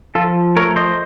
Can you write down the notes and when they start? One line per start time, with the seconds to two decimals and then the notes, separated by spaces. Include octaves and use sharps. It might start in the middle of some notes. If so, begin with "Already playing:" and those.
0.15 F3 F4 A4
0.56 A3 A#4 C#5
0.76 C5 D#5